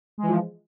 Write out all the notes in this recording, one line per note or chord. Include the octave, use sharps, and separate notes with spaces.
E3 F3 G#3